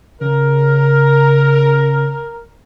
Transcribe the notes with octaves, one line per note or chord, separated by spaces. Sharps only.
C#3 A#4